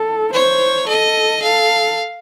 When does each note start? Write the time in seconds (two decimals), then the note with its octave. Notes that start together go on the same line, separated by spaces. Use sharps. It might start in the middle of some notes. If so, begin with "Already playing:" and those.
Already playing: A4
0.33 C5 C#5
0.88 A4 D#5
1.42 A4 F5